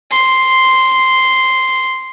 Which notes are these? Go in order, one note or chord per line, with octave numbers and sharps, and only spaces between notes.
C6